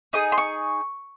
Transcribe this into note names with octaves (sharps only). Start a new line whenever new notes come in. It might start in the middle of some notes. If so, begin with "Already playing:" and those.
D#4 G#4 D#6
C6
C#6